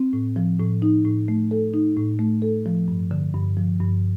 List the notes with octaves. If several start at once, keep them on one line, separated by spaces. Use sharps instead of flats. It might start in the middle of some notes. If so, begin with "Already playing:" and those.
Already playing: C4
A2
F3
A2
D#4
A2
A3
A4
D#4
A2
A3
A4
F3
G2
D3
G2
F3
G2